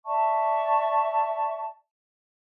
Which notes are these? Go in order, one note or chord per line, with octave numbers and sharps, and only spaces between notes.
D5 E5 A5 C#6